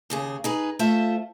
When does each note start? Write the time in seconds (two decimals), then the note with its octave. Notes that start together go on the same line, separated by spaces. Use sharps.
0.10 D#2 C#3 G#4
0.44 D#4 G#4 B4
0.79 A3 F4 C5 E5